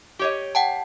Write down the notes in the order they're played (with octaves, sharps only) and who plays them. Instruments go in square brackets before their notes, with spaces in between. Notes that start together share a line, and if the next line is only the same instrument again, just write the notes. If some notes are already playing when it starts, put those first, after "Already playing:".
[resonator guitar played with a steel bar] G4 C#5 D#5
[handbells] F#5 G5 A5